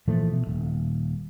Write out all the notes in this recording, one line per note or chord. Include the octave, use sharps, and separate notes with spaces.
A#2 E3 F3 A3
B2
D#1